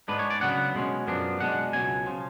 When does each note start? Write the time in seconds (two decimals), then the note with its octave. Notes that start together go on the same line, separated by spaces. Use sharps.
0.08 G#2 G#3 B3 D4 B4
0.19 C#5
0.30 D5
0.41 C#3 F#3 B3 D4 F#5
0.75 B2 G#3 C#4
1.07 F#2 F3 B3 D4
1.40 B2 G#3 D4 F#5
1.73 C#2 B2 F#3 G#5
2.06 C#3 F3